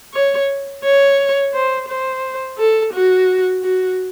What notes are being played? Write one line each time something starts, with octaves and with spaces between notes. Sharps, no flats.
C#5
C#5
C5
C5
A4
F#4
F#4